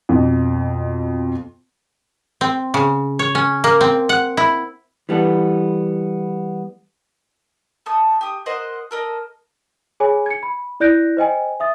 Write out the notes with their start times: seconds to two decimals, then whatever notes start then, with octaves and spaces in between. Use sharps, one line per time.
0.09 F2 B2
2.41 C4
2.74 C#3
3.19 C#5
3.35 C#4
3.64 A#3
3.81 C4
4.09 F#5
4.37 E4
5.09 E3 G3 B3 A4
7.86 A3 A5 D#6
8.21 G4 D#6
8.46 A#4 C5 D#5 F#5
8.91 A4 A#4 D#5
10.00 G#4 C#5 G#5 B5
10.26 G#6 C#7
10.43 B5
10.80 E4 D5 F#6 G6 A#6 D7
11.17 C5 D#5 G5 G#5
11.60 E5 D#6 A6